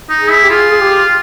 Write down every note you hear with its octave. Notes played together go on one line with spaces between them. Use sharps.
D#4
G#4
E4
G4
F4 G#4
G#4
G4